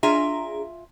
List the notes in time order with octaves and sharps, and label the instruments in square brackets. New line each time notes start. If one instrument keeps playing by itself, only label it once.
[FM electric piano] D4 G#4 A#5 [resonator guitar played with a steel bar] F4 E5 G#5